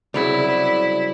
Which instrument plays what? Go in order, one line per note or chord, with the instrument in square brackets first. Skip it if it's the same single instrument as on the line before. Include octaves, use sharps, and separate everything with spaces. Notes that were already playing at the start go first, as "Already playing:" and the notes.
[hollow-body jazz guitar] C2 C#3 F#3 [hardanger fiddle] E4 [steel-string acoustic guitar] D5